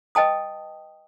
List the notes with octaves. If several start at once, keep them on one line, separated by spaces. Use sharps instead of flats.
B4 D#5 G5 A5 D#6